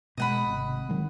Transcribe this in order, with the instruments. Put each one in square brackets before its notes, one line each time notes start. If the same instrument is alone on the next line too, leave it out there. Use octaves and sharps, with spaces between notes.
[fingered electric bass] B2 G#3 [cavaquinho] D#5 F#5 B5
[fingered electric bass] G#1 C3
D#3 F#3 G#3